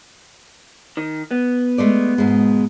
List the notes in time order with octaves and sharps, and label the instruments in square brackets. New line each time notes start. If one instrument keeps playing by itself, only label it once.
[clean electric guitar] D#3
B3
[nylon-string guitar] G#3 A3 D5
G#2 B2 G#3